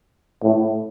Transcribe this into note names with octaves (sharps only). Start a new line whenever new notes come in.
A2